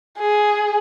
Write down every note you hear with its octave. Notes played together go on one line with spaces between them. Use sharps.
G#4